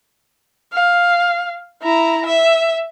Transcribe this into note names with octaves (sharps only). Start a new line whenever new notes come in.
F5
E4 A#5
E5